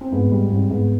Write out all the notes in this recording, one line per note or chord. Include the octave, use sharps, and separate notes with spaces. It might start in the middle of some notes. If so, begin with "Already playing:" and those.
C4
G#2 B3
G3
G#2 C4
G#2 B3